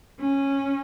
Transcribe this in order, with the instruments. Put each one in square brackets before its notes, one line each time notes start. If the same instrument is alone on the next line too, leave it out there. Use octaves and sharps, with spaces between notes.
[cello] C#4